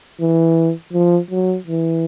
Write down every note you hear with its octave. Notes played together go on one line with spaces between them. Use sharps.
E3
F3
F#3
E3